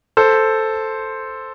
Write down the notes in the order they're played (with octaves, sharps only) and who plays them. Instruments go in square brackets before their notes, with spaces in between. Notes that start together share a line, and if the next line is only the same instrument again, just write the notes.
[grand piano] A4 C5